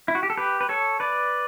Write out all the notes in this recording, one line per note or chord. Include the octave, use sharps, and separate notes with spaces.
E4
F#4
G4
A4
G4 B4
B4
A4 C#5
B4 D5